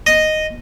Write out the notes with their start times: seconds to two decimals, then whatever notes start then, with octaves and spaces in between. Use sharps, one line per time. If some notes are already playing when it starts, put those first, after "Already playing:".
0.07 D#5